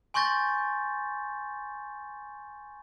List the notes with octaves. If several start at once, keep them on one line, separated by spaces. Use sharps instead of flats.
G#5 C6 C#6 G6 A6 A#6